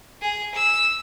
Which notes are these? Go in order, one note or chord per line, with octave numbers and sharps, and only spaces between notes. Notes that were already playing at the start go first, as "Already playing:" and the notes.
G#4
E6